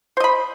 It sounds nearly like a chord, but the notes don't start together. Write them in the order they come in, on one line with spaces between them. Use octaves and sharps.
C5 D#5 B5